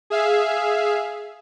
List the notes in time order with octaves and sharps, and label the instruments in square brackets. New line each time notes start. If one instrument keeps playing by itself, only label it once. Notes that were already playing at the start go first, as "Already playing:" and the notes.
[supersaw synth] G#4 E5 F5